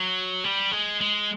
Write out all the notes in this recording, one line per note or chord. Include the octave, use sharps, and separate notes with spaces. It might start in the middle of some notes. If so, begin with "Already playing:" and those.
Already playing: F#3
G3
G#3
G#3